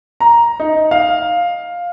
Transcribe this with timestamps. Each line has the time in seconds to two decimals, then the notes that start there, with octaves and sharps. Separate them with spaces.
0.20 A#5
0.60 D#4
0.91 F5